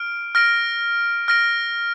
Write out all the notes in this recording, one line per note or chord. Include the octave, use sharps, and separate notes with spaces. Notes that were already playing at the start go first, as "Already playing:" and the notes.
Already playing: F6 D7
F6 A#6 D7
F6 A#6 D7